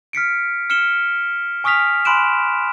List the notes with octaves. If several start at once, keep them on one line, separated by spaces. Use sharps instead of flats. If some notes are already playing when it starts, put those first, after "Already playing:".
F6 B6 C#7 D7
F6 C#7 E7 G7
G#5 C#6 D#6 F6 B6 F7
G#5 B5 C6 F#6 D7 E7